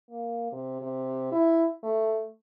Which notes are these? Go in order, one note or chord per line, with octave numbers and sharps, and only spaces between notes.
A#3
C3
C3
E4
A3